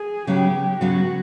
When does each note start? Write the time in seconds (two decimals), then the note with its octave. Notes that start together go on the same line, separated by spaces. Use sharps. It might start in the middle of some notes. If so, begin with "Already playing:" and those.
Already playing: G#4
0.27 C#3 F#3 B3 G4
0.80 C#3 F#3 B3 F#4